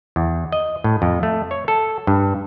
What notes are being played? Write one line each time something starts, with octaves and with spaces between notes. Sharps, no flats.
E2
D#5
A2
F2
A3
C#5
A4
G2